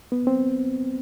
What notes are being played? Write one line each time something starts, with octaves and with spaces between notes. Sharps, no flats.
B3
C4